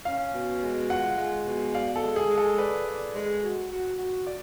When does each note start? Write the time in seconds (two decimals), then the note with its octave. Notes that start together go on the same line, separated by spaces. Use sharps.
0.05 C#4 F5
0.34 B2
0.62 G#3
0.90 F4 F#5
1.18 G#3
1.46 B2
1.74 D5 F5
1.96 A4
2.02 G#3
2.16 G#4
2.30 G#3
2.38 A4
2.58 B4 D5
2.86 D5
3.15 G#3
3.43 F#4
3.71 F#4
3.98 F#4
4.27 D5